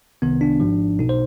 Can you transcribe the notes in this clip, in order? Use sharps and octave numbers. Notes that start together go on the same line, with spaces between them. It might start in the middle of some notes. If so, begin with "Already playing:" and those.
C2 C3 D#3 B3
D4
G#1 G#2 F3
B1 B2 D#4
C5